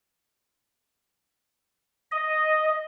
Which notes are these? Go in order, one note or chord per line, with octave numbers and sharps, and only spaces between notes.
D#5